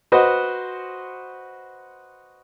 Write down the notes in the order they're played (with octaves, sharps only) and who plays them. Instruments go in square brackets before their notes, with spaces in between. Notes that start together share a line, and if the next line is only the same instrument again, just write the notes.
[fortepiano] F#4 B4 C5 D#5 F#5